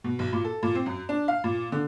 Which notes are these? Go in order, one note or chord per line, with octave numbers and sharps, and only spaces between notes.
B2
B1
A#2
A4
A#2
C4
F#2
D4
F5
A#2
D3